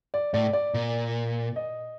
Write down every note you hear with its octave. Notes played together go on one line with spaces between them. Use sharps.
D5
A2 D5
D5
A#2
D#5